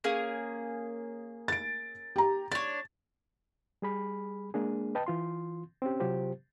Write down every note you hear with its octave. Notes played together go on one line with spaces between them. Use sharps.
A#3 C#4 G#4
A6 D7
G4 A#5
D4 C#5 A6
G3 G#4 B5
G#3 A#3 D4 G#4
B4 D#5 G5 A5
E3 F4 C6
C4 C#4 G4
C3 F#3 F4 G4 C5